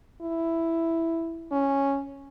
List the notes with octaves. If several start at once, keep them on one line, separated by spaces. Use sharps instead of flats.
E4
C#4